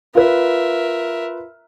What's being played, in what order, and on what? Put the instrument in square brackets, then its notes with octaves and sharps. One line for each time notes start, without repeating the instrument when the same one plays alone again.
[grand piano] F4 B4 [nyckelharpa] A#4 E5